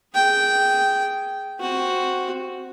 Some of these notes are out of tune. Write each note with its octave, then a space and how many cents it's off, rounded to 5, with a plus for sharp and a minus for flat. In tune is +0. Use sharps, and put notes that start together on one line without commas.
G#4 +0 G5 -10
C4 +0 F#4 +0